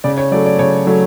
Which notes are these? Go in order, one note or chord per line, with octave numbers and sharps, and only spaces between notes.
C#3 D5
C#5
F#3 A3 D5
D5
C#3 C#5
F#3 A3